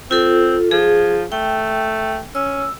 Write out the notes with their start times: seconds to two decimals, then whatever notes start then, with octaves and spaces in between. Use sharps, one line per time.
0.11 C4 F4 A4
0.71 F3 G#4
1.32 A3 G5
2.35 C#4 E6